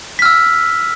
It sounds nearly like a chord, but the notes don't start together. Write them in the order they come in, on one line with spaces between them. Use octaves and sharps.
B6 F6 E6